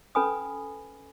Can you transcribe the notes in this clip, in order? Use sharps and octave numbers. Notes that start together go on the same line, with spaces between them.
C#4 A4 B4 G#5 B5 D#6